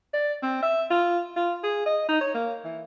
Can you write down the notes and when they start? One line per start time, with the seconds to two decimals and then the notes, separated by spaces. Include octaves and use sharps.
0.14 D5
0.43 C4
0.63 E5
0.90 F4
1.36 F4
1.64 G#4
1.86 D#5
2.09 D#4
2.21 C#5
2.34 A#3
2.65 E3